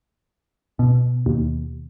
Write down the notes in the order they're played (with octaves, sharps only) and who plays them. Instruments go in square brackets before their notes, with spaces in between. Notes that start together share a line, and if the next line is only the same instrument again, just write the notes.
[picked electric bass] B2
[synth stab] D#2